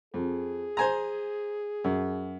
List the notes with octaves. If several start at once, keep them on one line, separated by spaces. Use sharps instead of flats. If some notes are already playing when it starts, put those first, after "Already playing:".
F2 G#4
C5 G#5 A#5
F#2